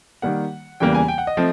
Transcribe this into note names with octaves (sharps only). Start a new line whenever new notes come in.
D#3 G3 A#3 F#5
E2 C#3 E3 G3 A#3 G5
G#5
G5
F#5
D#5
F3 A3 C4